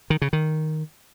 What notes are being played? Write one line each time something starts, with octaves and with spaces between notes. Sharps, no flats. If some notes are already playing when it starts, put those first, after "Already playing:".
D#3
C#3
D#3